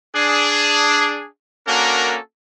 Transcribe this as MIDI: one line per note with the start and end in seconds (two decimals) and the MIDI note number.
0.16 1.26 62
0.16 1.26 68
1.67 2.17 58
1.67 2.17 61
1.67 2.17 62
1.67 2.17 66
1.67 2.17 69
1.67 2.17 70